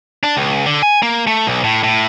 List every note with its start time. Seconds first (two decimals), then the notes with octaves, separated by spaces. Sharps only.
0.24 D4
0.37 C#2
0.66 D3
0.83 G#5
1.03 A#3
1.27 A3
1.47 B1
1.64 A2
1.83 A2